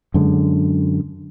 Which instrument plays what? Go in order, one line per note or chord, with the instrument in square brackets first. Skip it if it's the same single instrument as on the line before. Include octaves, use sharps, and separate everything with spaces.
[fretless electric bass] F#2 D3 G#3